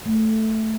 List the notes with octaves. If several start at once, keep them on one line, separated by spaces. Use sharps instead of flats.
A3